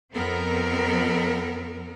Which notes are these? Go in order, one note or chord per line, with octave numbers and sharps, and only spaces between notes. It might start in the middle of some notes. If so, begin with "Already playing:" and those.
F2 B3 C4 A4 A#4